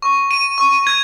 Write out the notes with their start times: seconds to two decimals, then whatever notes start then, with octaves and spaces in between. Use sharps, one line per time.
0.02 C#6
0.31 D#7
0.58 C#6
0.87 G#6